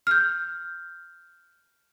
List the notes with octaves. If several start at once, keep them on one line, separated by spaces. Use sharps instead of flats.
F6 G6